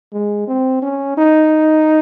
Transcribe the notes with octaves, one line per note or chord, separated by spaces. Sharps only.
G#3
C4
C#4
D#4